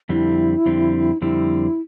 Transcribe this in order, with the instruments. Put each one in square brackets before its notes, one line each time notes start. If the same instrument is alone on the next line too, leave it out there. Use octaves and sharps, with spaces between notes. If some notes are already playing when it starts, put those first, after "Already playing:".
[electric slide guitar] F2 D3 G3 C4 [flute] E4
[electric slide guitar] F2 D3 G3 C4
[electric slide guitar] F2 D3 G3 C4 [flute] E4